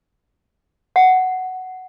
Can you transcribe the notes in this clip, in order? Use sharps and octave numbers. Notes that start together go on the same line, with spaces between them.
F#5